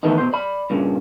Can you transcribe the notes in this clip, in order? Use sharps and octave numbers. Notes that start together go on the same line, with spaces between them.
D#3 E3 A3 B3 D#4
B2 C5
D5 B5
G2 A#2 C#3